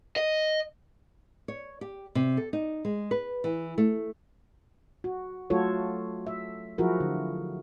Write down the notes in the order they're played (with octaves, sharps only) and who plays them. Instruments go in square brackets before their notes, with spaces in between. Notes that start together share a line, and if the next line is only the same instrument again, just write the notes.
[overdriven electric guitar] D#5
[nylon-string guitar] C#5
G4
C3
A4
D#4
G#3
B4
E3
A3
[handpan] F#4
F#3 A3 F4 F#4 A4 C#5
E5
F3 F#3 E4 F#4 G#4 A#4
D3